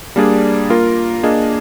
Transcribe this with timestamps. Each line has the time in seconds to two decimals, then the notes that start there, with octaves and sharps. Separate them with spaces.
0.16 G3 A#3 D4 G#4 D5
0.70 A#3 F4 A#4
1.23 A#3 D4 G#4 D#5